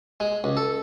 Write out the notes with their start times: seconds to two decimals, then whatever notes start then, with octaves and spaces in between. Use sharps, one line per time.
0.20 G#3
0.44 C#2
0.57 A4